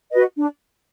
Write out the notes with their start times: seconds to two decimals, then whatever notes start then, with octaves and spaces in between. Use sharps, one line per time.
0.11 F#4 B4 D#5
0.35 D4